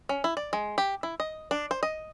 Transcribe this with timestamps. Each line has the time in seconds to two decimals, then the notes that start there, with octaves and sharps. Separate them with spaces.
0.09 C#4
0.24 E4
0.37 D5
0.53 G#3
0.78 G4
1.03 E4
1.20 D#5
1.51 D4
1.71 C5
1.83 D#5